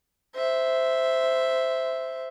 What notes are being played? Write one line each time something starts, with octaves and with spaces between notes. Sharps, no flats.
C5 E5